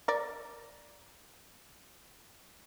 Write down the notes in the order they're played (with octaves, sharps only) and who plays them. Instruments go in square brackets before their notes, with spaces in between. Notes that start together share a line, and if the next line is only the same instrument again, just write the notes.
[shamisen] A#4 D5